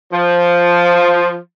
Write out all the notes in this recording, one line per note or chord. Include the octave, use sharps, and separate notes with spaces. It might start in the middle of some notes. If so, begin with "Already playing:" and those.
F3